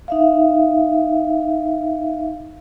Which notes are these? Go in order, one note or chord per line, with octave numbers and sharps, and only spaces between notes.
D#4 E5 F5